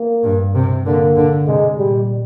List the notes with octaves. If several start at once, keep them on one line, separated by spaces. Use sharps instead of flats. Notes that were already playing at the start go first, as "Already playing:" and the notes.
Already playing: A#3
G2
C3
D3 A#3
D3
C3 G#3
A#2 G3